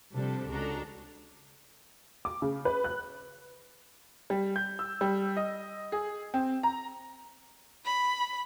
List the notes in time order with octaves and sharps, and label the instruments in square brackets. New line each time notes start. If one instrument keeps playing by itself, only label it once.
[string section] C3 F3 G3 D4 A4
C#2 G#3 D4 F#4 A4 A#5
[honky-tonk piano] D6
C#3
B4
F#6
[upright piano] G3
G6
E6
G3
D#5
G#4
C4
A#5
[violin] B5